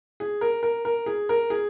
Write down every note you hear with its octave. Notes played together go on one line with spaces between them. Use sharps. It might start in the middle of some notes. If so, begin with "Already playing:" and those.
G#4
A#4
A#4
A#4
G#4
A#4
G#4